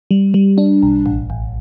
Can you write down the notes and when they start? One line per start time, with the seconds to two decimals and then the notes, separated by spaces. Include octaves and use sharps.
0.11 G3
0.34 G3
0.58 D4
0.83 B1
1.06 A1
1.30 A1